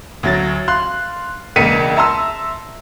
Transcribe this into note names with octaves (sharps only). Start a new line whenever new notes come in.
D2 F#3 A6
F5 C6 F#6
E1 C#2 A#3 B6 C#7 D#7
E5 A5 A#5 C6 E6